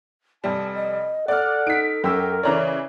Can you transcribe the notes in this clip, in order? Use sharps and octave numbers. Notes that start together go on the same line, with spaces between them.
F1 G3 A5
D#5
A4 D5 F#5 F6
D#4 B6 D7
F#2 G4 A#4 E6
C#3 E3 C#5 D5 A#5